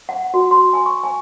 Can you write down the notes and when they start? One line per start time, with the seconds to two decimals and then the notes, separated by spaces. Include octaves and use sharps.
0.09 F#5
0.34 F#4
0.51 C6
0.73 G#5
0.86 C#6
1.04 G#5